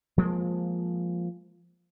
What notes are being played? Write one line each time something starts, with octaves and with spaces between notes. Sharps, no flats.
F3 G#3 A#3